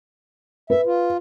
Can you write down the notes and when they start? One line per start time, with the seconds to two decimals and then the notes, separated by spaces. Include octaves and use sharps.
0.70 B4 E5
0.86 F4